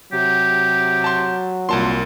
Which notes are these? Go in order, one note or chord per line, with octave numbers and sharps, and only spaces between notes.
C3 F#3 G4
A5 C6
C2 A#2 A5 C6